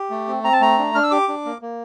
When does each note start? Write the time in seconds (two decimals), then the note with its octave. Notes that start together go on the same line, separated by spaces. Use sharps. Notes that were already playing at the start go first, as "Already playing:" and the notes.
Already playing: G4
0.10 A3
0.28 C4
0.44 C4 A#5
0.53 A5
0.60 A3 A#5
0.78 D4
0.95 D4 F6
1.04 E6
1.11 G4 D6
1.28 D4
1.45 A#3
1.61 A#3